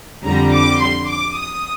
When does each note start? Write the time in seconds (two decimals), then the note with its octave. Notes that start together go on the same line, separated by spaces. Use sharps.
0.25 F2 D3 G3 A#5
0.53 D6
0.80 C6
1.09 D6
1.37 D#6